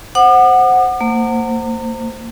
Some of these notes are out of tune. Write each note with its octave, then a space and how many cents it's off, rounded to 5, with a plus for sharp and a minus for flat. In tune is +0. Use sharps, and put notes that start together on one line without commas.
C5 +0 F#5 +0 D6 +45
A#3 -35 C5 +0